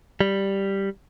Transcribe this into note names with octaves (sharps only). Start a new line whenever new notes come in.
G3